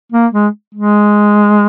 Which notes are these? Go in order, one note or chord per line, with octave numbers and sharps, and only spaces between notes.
A#3
G#3
G#3